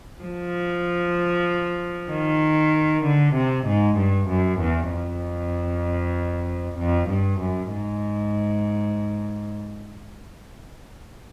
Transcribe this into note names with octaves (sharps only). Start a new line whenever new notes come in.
F3
D#3
D3
C3
G#2
G2
F#2
E2
F2
F2
G2
F#2
G#2